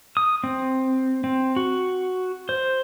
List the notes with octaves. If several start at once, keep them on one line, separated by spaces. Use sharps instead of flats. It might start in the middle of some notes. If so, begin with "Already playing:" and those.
D#6
C4
C4
F#4
C5